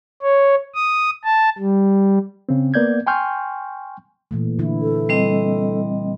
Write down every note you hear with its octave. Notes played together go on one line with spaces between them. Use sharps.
C#5
D#6
A5
G3
C#3 C4
A#3 B3 D5 G6 G#6
G5 G#5 C6 C#6 F6 G6
A#2 E3 A3
D3 E3 E4
A4
G3 C4 D#5